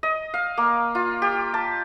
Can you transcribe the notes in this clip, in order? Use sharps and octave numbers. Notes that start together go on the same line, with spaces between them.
D#5
F5
A#3
F4
G4
A5